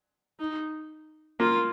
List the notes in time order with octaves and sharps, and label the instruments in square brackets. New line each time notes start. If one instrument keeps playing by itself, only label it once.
[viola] D#4
[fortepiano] A#3 [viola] F4